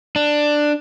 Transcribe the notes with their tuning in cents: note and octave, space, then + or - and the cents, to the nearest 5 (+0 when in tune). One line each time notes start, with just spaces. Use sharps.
D4 +10